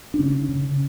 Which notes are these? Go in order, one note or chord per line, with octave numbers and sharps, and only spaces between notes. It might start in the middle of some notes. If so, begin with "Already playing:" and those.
D4
C#3 C#4
C#3